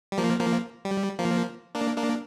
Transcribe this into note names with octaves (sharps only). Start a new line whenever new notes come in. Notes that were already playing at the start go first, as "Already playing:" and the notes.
G3
F3 A#3
F3 A#3
G3
F3 A#3
A#3 D4
A#3 D4